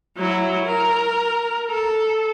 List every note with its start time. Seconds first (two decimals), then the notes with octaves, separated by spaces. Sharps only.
0.17 F#3 E4
0.65 A#4
1.70 A4